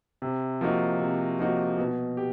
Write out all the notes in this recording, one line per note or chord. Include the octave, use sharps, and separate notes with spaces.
C3
F3 A#3 D#4 F#4
C3
F3 A#3 D#4 F#4
B2
G4